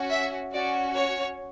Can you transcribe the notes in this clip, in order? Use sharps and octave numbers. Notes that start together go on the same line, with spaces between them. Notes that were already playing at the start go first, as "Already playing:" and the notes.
Already playing: C#4 F#4
E5
C#4 F#4 D5
C#5